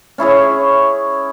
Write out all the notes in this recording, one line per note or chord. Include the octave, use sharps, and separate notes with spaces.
C#4 E4 G#4 C#5